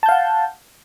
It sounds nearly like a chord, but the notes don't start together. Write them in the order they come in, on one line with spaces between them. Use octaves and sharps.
A5 G6 F5 F#5